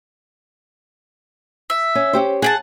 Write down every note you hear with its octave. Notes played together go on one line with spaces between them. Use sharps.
E5
C#4
C#4 G4 C5
G#4 F#5 G5 A5